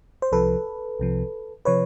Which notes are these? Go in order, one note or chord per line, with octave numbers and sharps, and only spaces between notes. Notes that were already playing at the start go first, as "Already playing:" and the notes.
C5
C2 C3 F3 A4 B4
C2 C3 F3
C3 F3 B4 C#5